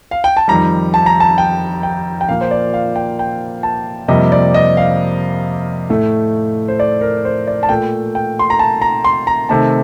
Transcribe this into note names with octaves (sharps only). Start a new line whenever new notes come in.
F5
G5
A5
F2 D#3 G3 A#5
A5
A#5
A5
G5
G5
G5
A#2 F3 A#3 F5
C5
D5
F5
G5
G5
A5
F2 C3 G3 A#3 D#5
D5
D#5
F5
A2 A3
C5
D5
A#4
C5
D5
A5
A#2 A3 G5
G5
C6
A#5
A5
A#5
C6
A#5
C3 D#3 A3 A5